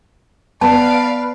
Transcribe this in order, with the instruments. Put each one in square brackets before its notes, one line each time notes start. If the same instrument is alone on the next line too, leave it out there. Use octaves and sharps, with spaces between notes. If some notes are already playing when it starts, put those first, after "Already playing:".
[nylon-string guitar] B3 [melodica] B4 [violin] D5 F5 [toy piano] A5